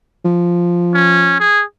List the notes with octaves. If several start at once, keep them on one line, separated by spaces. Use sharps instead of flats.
F3
C#4
G#4